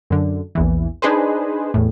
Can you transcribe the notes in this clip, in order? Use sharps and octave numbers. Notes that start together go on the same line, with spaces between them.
F#2 D3
A#1 E2 E3
D4 D#4 G#4 B4 C5
E2 A2